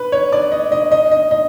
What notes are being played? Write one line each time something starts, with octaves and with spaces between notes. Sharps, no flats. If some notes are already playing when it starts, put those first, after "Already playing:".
Already playing: B4
C#5
D5
D#5
D#5
D#5
D#5
D#5